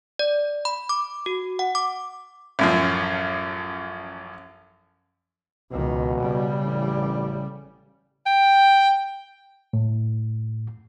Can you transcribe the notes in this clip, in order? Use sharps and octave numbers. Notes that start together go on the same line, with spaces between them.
D5
B5
D6
F#4
F#5
D6
A1 F#2 F3
C#2 B2 D#3
C#3 G3
A1
G5
A2